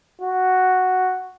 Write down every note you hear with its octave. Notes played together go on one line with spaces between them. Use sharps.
F#4